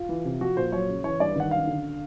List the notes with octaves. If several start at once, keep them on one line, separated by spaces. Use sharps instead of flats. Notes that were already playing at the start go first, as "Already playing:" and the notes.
Already playing: F4
E3
C3
F3 F#4
A#2 C5
F#3 C#5
C#3
E3 C#5
G2 D5
D#3 F#5
F#2 F5
D3